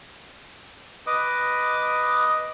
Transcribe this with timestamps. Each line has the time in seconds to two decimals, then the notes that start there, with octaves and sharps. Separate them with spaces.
1.07 B4 D#5 D6 D#6